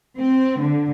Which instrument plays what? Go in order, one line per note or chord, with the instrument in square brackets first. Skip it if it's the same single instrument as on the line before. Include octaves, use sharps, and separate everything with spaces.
[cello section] C4
D3